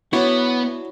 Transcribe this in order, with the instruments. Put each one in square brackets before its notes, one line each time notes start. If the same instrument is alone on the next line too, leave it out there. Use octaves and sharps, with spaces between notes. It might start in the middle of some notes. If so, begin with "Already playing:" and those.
[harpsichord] F#3 D4 [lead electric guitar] B3 [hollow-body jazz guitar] E4 F#4